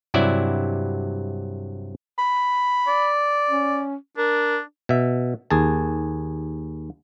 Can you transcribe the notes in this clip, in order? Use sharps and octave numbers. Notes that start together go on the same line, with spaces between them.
G2 C3 F#3 E4 D5 E5
B5
D5
C#4
D4 A#4
B2 E5
D#2 G#4 A5